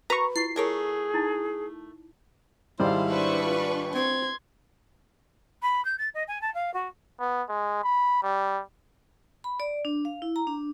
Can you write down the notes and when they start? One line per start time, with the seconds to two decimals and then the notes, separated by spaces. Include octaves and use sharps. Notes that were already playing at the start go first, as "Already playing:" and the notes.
0.10 F#4 A#4 B4 A#5 C#6
0.36 E4 F4 C#6 C7
0.56 A3 G#4 A#4 C#5
1.14 D#4 E4 A5
2.80 G#1 G3 E4 C5 F5
3.10 D4 B4 C5 C#6
3.47 F4
3.94 C4 C6 G#6
5.62 B5
5.85 G6
5.98 A6
6.14 D#5
6.28 G#5
6.42 A5
6.54 F5
6.74 F#4
7.20 B3
7.49 G#3
7.84 B5
8.23 G3
9.44 B5
9.60 D5
9.85 D4
10.05 F5
10.22 E4
10.36 A#5
10.47 D4